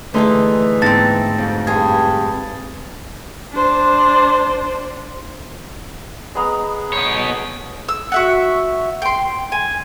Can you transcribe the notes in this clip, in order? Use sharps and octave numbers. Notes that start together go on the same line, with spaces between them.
D3 E3 A3 D#4 G#4 A4 C6
G#2 B3 C4 A5 A6 A#6
F2 F#4
G2 G#4 G#6
D4 C5
G#3 B3 A#5
B3 C5 C#5
E6
F#4 E5 F#5
G5 C6
G#5